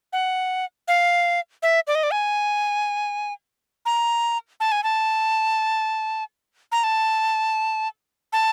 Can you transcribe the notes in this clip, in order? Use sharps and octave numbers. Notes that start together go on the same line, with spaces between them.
F#5
F5
E5
D5
D#5
D5
G#5
A#5
A5
G#5
A5
A#5
A5
A5